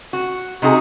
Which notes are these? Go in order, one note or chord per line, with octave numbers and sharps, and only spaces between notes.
F#4
C3 D#4 F#4 G#4